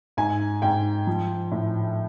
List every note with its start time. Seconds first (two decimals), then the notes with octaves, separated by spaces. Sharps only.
0.17 G#2 G#5
0.62 G#2 G5
1.07 F3
1.51 A2